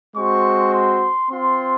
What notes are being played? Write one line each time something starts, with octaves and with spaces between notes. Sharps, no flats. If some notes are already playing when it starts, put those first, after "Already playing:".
G#3 C4 F#4 C#6
C6
C4 F4 C6